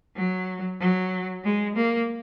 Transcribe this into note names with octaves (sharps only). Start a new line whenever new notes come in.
F#3
F#3
G#3
A#3